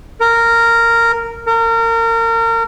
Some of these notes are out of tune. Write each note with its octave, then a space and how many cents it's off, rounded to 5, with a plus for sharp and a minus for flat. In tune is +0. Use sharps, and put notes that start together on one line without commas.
A#4 -10
A#4 -30